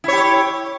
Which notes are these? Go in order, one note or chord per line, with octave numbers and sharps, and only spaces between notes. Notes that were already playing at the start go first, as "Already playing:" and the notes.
E4 G4 C#5